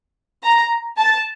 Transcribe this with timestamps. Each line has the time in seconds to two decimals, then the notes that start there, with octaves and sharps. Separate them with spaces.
0.44 A#5
0.98 A5